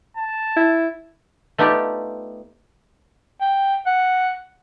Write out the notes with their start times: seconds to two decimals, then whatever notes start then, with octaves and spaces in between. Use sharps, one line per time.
0.17 A5
0.57 E4
1.58 A3 B3 D#4 F4 G4 D5
3.41 G5
3.86 F#5